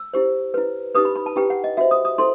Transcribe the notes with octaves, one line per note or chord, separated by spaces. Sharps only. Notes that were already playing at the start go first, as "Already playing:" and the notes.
Already playing: E6
E4 G4 C5
E4 B4
D#4 G4 B4 D#6
B5
B5
A5
E4 G4 B4 G5
F#5
D#5
F#4 C5 E5
D#6
D#6
E4 A4 C5 C6